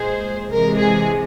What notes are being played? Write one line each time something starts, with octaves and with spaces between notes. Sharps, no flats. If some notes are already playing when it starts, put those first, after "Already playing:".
Already playing: A#2 G#3 G#4 C5
C3 E3 G#3 A#4
G#4